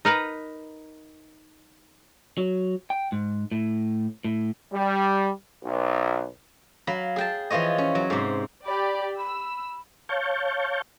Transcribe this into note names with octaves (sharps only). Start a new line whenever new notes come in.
D#4 A#4 B4 A#5
F#3
G5
G#2
A2
A2
G3
B1
F#3 F5 B5
G#4 G5 A5
E3 F3 F4 C#5 D#5
C#4
F#3
G#2 C3
G4 D5 B5
B5 E6
C#5 F5 A5 C#6 G6